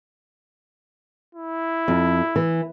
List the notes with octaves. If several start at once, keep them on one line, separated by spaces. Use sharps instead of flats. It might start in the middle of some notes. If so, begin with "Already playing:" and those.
E4
F2
E3